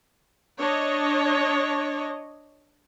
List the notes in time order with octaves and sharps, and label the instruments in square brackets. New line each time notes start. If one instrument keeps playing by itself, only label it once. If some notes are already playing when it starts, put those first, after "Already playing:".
[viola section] D4 C#5 D#5